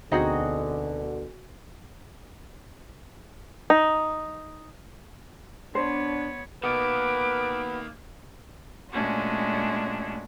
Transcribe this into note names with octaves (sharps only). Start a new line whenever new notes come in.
D2 B2 D3 C4 D#4 F#4 G#4 D#5
D#4
B3 D4 C5 C#5
B2 D#3 A#3 B3 B4 D6
A#2 G#3 A3 C#4 D4 F#4